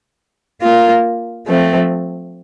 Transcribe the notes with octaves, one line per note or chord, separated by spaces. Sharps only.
A#3 F4 A#4
F3 A3 C4